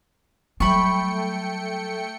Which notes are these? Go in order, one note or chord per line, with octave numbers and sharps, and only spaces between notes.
F#3 G3 A3 G5 B5 C#6 C#7